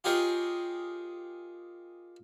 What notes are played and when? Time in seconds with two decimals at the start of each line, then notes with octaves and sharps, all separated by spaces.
0.04 F4 G4 G#4 A#4 C#5 D#5